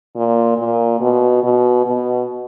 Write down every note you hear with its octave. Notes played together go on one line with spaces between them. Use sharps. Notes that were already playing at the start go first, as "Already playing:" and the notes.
A#2
A#2
B2
B2
B2